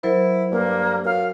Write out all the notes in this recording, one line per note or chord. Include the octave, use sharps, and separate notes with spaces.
F#3 E4 A#4 C5
G2 A#3
F#2 F5